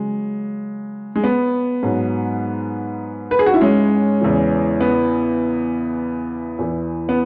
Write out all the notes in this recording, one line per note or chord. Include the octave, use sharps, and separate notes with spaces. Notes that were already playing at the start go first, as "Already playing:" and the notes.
Already playing: C#3 F#3 G#3
G#3
B3
G#2 F#3
B4
G#4
F#4
E4
G#3 C#4
E2 C#3 E3
B3
E2 E3
B3